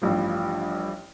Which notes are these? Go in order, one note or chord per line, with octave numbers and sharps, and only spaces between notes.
A1 G2 F3